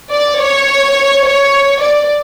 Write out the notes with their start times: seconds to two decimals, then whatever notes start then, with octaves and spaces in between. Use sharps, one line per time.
0.12 D5
0.40 C#5
1.25 C#5
1.82 D5